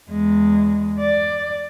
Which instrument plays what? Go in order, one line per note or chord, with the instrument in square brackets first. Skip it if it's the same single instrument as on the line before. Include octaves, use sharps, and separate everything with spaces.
[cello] E2 G#3
D5